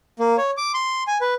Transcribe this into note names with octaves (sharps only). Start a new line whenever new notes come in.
A#3
C#5
D6
C6
G#5
B4